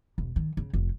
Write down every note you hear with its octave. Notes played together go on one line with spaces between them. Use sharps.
E1
D#3
C#3
F1